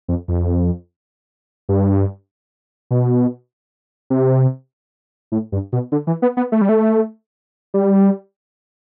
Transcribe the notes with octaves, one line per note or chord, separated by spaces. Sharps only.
F2
F2
G2
B2
C3
A2
G2
B2
D3
E3
B3
B3
A3
G3
A3
G3